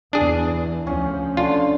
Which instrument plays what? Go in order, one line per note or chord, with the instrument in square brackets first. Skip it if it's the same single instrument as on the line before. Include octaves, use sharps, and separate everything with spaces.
[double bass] E2 E3 [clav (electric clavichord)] D4 G#4
[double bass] D2 F3 [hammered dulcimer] C#4
[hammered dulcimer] D3 [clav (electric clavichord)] F4